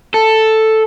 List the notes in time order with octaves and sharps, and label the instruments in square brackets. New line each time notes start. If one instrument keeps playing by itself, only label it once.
[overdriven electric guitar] A4